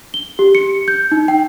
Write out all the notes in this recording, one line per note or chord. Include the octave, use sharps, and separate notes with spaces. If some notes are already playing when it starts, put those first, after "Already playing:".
G7
G4
C#7
G6
D#4
G5